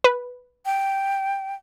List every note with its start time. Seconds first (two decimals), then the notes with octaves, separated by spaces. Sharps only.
0.04 B4
0.66 G5